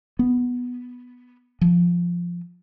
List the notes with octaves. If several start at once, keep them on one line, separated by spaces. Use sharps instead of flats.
B3
F3